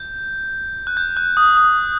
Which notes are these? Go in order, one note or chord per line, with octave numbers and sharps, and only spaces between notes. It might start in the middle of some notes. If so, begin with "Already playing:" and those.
Already playing: G6
F#6
G6
F#6
D#6
D#6